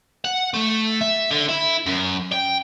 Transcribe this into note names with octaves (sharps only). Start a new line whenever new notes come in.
F#5
A3
E5
D3
E4
F#2
G5